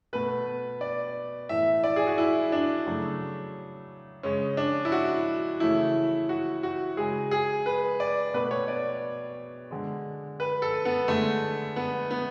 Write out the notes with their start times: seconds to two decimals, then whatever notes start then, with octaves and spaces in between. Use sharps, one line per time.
0.13 B2 A3 B4
0.81 D5
1.49 A2 E3 A3 E5
1.84 D5
1.96 G#4
2.07 F#4
2.18 E4
2.52 D4
2.87 C#3 F#3 A3
4.23 C#3 G#3 C#4
4.57 D4
4.85 E4
4.92 F#4
5.60 C#3 E3 A3 E4
6.29 F#4
6.63 F#4
6.97 C#3 G#3 G#4
7.31 G#4
7.66 B4
8.00 D5
8.34 B2 A3 B4
8.51 C#5
8.68 D5
9.71 D3 G#3
10.40 B4
10.62 A4
10.85 B3
11.08 D3 G#3 A3
11.76 B3
12.11 B3